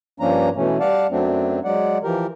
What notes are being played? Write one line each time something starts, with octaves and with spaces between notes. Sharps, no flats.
G2 F3 A#3 C#4 D4 A#5
B2 E3 A3 C#4
G3 D5 F5 F#5 A5
F#2 F#3 A3 C4 D4
F#3 G#3 D5 F#5
E3 F3 G4 A#4